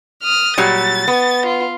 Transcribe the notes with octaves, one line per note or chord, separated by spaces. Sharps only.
D#6 F6
A#2 F#3 G3 A6
B3
F4